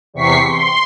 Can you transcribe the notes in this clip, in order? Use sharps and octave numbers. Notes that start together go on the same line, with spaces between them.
E2 C3 C#6 B6 C7
C6